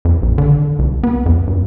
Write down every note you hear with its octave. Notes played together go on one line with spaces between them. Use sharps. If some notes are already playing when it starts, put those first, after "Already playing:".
F2
A#1
D3
C2
B3
F2
G2